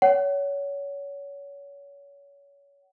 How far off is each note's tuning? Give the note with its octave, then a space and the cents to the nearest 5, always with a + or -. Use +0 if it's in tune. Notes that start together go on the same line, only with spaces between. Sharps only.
C#5 +25 F#5 +25